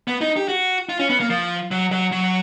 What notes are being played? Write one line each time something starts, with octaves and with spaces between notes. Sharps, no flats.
B3
D#4
G4
F#4
F4
C#4
B3
A#3
F3
F#3
F#3
F#3